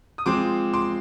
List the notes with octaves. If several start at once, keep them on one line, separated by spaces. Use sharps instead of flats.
D#6
F3 G#3 C4 C6 D6
C6 D6